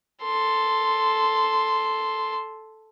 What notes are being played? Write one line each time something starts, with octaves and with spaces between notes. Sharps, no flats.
A4 C6